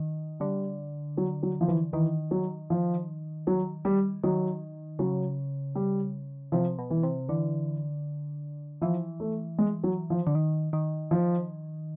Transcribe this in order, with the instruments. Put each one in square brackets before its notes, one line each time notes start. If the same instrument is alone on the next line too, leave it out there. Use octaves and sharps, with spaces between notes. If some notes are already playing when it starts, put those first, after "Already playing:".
Already playing: [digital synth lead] D#3
[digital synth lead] D3 [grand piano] G3
[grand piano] F#3
F#3
F3
E3
[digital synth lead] D#3 [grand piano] E3
[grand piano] F#3
F3
F#3
G3
[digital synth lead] D#3 [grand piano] F#3
[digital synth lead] C#3 [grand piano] F#3
[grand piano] G3
[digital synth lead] C3 [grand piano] F3
[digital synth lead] B2
[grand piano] E3
[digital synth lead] C3
[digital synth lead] D3 [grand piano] E3
[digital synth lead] E3 [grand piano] F3
[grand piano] A3
G#3
F#3
F3
[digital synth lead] D3
D#3
D#3
[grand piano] F3